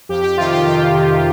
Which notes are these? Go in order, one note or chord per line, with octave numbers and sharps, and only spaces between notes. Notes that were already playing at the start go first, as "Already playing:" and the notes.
F2 G4
G4
C3 D#3 F4
G4
F2 G4
C3 D#3